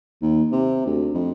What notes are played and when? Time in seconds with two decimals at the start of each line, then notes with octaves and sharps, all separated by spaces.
0.22 D#2
0.52 C3
0.86 D2
1.14 F2